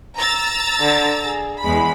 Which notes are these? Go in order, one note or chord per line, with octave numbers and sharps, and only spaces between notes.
A#5 E6 A6
D3
G#4
E2 G#3 B5